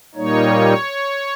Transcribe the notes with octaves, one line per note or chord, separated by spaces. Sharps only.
A#2 G3 A#3 D#4 C#5